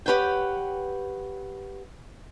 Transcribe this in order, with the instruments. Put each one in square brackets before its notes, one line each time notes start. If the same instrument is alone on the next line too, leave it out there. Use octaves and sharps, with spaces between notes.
[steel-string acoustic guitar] G4 A4 B4 C#5 F#5 G5